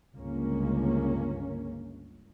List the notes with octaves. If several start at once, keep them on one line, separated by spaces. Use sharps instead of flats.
G1 C#2 A#3 C#4